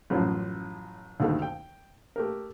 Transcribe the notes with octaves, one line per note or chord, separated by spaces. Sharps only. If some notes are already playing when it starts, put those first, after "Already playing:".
A1 F#2 A2 F3 F4
D2 G2 D3 D#3 A3
G5
A3 G4 A#4